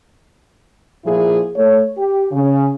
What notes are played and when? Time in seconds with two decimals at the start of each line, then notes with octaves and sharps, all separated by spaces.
1.06 A#2 F3 E4 G#4
1.56 A3 C#5
1.97 G4
2.31 C#3